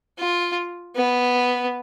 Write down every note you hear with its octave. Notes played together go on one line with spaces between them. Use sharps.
F4
B3